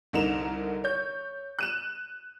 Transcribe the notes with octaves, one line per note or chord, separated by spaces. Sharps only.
C2 D3 D#4 A#4 E7 F7
C#5 G6
F#6 D#7 E7